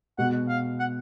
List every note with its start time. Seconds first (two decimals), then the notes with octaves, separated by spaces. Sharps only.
0.18 B2 G#3 B3 F#4 F#5
0.49 F5
0.79 F#5